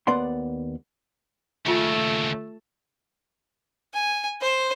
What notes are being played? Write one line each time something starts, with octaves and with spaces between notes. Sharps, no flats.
D#2 B3 D5 F#5 C6
D#2 C#3 A3 F4 C#6
G#5
C5